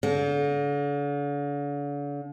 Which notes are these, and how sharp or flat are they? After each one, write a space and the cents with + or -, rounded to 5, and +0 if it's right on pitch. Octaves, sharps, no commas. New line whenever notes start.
D3 -40